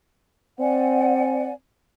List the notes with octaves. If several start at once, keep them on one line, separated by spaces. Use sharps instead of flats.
C4 D5 F#5 G#5